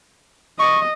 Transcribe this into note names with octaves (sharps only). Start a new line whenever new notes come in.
D#5 C#6